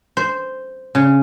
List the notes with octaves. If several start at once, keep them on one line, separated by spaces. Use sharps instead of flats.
C5
C#3